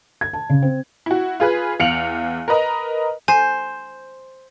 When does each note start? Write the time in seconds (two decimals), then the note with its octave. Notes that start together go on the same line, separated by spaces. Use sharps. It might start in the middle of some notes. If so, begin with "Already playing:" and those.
0.21 G#6
0.33 A5
0.49 C#3
0.62 C4
1.06 E4 F#4
1.40 F4 G#4 B4
1.80 E2 F5 C#7 D7 F7 F#7
2.48 A#4 B4 D#5 A#5
3.28 C5 G#5